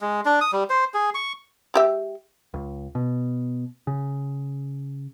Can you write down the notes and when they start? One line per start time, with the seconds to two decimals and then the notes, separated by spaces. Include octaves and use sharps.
0.01 G#3
0.25 D4
0.41 D#6
0.52 G3
0.70 C5
0.94 G#4
1.14 C#6
1.74 G#3 G4 E5
2.54 C#2
2.95 B2
3.87 C#3